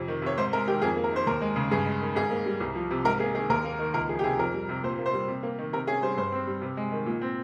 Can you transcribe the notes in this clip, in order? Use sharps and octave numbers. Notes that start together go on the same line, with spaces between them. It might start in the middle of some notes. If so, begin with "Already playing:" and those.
Already playing: F2 C3
D#3
C3 C#5
G#2 C5
G#3 A#4
D#3 G4
F2 G#4
A#3
A#4
D#3 C5
D#2 A#4
G#3
C#3
G2 G#4
G#3
D#3
G#2 G#4
A#3
G3
C2
F3
C3
G#2 A#4
A#3 G#4
D#3 G#4
D#2 A#4
A#3
D#3
C#2 A#4
F3 G#4
G4
C3 G#4
F2 A#4
G3
C3
A#2 C5
A#3
C5
G3
C3
A#3
D#3
C3 A#4
C#4 G#4
G3 C5
G2 C5
C4
G3
C3
G#3
D#3
A#2
C4